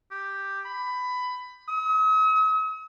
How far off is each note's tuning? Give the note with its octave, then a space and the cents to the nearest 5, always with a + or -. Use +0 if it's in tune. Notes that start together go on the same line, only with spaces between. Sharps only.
G4 +5
B5 +15
D#6 +45